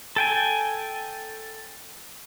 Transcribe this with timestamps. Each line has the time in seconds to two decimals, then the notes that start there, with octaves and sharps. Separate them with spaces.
0.16 A4 G5 G#5